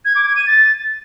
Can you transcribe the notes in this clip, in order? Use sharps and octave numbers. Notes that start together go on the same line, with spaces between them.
G#6
D6
G#6
D#7
A6